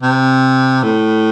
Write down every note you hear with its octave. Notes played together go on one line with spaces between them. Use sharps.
C3
A2